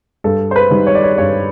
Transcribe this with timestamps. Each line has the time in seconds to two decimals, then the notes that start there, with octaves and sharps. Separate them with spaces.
0.24 G2 A4
0.51 C5
0.56 B4
0.71 D#3 G3
0.87 C#5
0.95 D5
1.04 C#5
1.18 G2 C#5